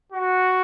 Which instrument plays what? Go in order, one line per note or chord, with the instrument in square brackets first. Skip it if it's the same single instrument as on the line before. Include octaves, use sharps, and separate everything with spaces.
[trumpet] F#4